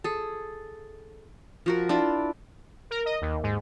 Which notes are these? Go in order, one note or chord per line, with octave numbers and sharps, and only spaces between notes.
G#4 A4
F3 F#4 A#4
D4 E4 F4 D5
A#4
D#5
D#2
G#2